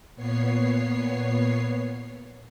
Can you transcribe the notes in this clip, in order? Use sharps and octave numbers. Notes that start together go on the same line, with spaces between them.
A#2 B3 C#5 C7